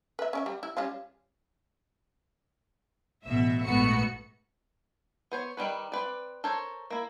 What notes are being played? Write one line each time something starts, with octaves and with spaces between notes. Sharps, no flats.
B4 E5
C#4 D5 E5
G3
E4
G3 C#4 F4
A1 B2 E5
A#1 G#2 A3 B3 F#4 C#7
B3 C5 C#5
D#3 G3 C#4 B4
C4 B4 D5
A4 A#4 C5 C#5
A#3 E4